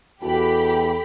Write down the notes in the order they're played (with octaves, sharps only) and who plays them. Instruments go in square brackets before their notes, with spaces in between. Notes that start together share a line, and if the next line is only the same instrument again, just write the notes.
[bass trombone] E2 [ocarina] F#4 [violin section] G4 B5 [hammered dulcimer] A4